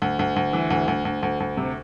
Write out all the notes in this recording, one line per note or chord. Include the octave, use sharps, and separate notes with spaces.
D2
D2
D2
E3
D2
D2
D2
D2
D2
C3